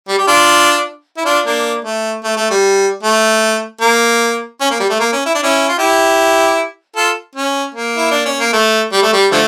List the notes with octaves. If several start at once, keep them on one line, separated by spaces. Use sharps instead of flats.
G3
G4
D4 F4
E4
D4 F4
A#3 D4
A3
A3
A3
G3
A3
A#3
C#4
A#3
G3
A3
A#3
C#4
E4
D4
C#4 E4
F4
E4 G4
F4 A4
C#4
A#3
E4
D4
C#4
A#3
A3
G3
A3
G3
D3 F3 A3